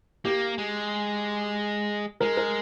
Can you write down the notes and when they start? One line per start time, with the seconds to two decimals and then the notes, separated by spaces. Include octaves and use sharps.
0.25 A#3 G4
0.58 G#3
2.20 G#3 A#4
2.37 A#4